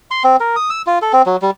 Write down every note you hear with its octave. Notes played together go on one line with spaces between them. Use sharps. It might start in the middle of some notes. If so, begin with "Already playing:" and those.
C6
C4
A#4
D#6
E6
F4
A4
C4
F#3
G3